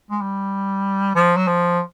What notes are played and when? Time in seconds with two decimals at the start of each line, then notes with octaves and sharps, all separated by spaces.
0.11 G#3
0.22 G3
1.16 F3
1.37 F#3
1.48 F3